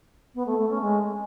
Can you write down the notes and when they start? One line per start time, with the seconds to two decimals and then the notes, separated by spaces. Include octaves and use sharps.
0.35 B3
0.46 A3
0.58 A3
0.70 C#4
0.81 G#3